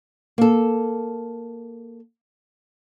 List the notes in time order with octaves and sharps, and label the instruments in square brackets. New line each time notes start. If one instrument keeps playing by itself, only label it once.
[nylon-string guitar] A#3 A4